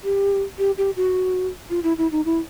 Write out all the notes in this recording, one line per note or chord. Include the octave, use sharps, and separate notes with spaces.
G4
G4
G4
F#4
F4
E4
E4
D#4
E4